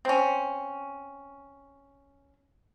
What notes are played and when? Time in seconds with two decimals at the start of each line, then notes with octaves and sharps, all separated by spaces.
0.05 C4 C#4